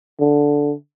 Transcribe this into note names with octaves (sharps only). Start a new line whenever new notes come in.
D3